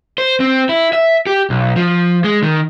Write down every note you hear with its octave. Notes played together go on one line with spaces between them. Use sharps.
C5
C4
E4
E5
G4
B1
F3
G#3
D#3